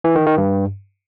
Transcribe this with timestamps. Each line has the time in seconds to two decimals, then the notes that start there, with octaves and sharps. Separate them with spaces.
0.04 E3
0.15 D#3
0.27 D#3
0.38 G2